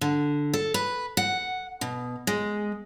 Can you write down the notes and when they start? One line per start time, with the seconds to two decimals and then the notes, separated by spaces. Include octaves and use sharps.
0.01 D3
0.53 A4
0.74 B4
1.17 F#5
1.81 B2
2.27 G#3